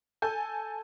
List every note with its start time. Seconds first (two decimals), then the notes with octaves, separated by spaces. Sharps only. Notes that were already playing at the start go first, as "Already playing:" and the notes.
0.22 A4 G#5 G6